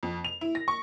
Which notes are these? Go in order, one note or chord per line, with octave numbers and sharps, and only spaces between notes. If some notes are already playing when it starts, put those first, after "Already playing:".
F2
F7
E4
A#6
C#6